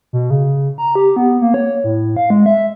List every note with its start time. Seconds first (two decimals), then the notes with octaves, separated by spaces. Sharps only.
0.13 B2
0.30 C#3
0.78 A#5
0.95 G4
1.16 B3
1.42 A#3
1.54 C#5
1.84 A2
2.16 F5
2.30 G#3
2.46 E5